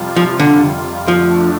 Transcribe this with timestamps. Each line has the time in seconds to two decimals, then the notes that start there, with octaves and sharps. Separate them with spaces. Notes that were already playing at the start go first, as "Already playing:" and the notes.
Already playing: F2 C3 G3 F4
0.16 F3
0.40 D3
1.08 F2 D3 F3 A3 D4